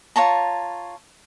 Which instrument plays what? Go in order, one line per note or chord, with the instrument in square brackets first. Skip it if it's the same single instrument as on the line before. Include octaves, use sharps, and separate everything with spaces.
[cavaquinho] F4 C#5 A5 A#5